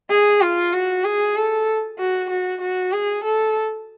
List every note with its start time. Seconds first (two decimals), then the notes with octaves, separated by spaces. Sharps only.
0.10 G#4
0.41 F4
0.73 F#4
1.04 G#4
1.36 A4
1.98 F#4
2.30 F#4
2.61 F#4
2.92 G#4
3.24 A4